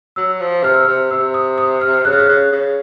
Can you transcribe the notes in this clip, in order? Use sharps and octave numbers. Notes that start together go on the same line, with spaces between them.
F#3 E6
F3
C3 F6
E6
C3 F6
C3 E6
D#6
D#6
F6
C#3 F#6
F6
F#6
C#3
C#3